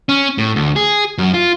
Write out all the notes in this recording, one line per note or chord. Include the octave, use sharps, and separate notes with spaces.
C#4
A2
D2
G#4
F#2
F4